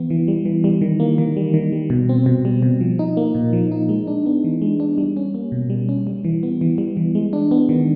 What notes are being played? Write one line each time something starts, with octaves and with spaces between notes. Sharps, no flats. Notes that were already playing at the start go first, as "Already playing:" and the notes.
Already playing: E3 B3
E3
G3
E3
G3
D#3
A#3
D#3
G3
D#3
G3
B2
C4
B2
G3
B2
F3
D#4
A#3
A#2
F3
D#4
G#3
D4
B3
E3
G#3
D4
G3
C#4
A#3
B2
G3
C#4
G3
E3
B3
E3
G3
E3
G#3
D4
B3
D#3